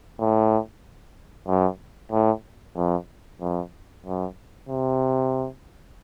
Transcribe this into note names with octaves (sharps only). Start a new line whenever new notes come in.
A2
F#2
A2
F2
F2
F#2
C3